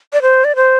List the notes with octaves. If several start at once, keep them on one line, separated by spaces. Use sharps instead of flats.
D5
C5
D5
C5